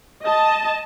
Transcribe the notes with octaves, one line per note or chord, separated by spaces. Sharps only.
D#5 A5